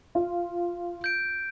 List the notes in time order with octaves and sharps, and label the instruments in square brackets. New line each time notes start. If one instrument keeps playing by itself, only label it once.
[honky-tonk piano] F4
[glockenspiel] G6 D7